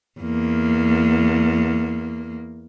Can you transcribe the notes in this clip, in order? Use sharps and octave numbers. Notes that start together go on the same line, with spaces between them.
E2 A#3